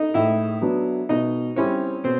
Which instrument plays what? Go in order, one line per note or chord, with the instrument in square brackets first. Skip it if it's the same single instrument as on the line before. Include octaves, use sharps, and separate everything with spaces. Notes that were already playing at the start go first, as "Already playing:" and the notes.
Already playing: [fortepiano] D#4 D#5
[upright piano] A2 [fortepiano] E4 E5
[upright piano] F#3 B3 D4
[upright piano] B2 [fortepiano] D#4 D#5
[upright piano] G3 C4 E4 [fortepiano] C#4 C#5
[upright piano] B2 [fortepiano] C4 C5